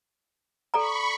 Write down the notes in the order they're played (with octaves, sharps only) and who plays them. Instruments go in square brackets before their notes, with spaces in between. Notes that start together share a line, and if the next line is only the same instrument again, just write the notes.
[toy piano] A4 D5 A#5 [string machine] B5 C#6